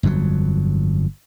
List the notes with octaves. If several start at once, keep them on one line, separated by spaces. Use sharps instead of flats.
G1 F2 A#2 F#3